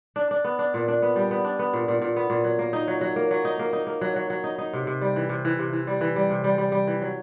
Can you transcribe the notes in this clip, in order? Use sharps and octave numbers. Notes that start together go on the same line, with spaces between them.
D4
D4
B3
D4
A#2
D4
B3
G3
B3
D4
B3
A#2
A#2
A#2
B3
A#2
F#3
A#3
D#4
F#3
F#3
A#3
F#3
D#4
A#3
D#4
A#3
F#3
F#3
F#3
D#4
D#4
C3
C3
G3
E3
C3
E3
C3
E3
G3
E3
G3
C3
G3
G3
G3
E3
F#3